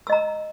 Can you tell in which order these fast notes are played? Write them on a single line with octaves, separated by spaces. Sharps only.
E6 D#5 A#5